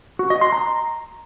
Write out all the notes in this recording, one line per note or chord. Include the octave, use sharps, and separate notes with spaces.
F#4
D#5
C6
A#5